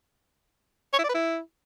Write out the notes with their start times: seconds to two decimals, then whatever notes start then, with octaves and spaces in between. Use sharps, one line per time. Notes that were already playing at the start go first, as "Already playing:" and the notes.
0.93 C#5
0.99 E4
1.04 D5
1.09 B4
1.14 E4